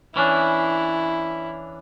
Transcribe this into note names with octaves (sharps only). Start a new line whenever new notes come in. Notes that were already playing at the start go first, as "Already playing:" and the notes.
E3 C#4 D4 E4